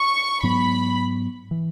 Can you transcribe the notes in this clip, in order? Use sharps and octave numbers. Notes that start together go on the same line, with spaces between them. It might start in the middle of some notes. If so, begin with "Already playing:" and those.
Already playing: C#6
G#2 F#3 B3 B5
E3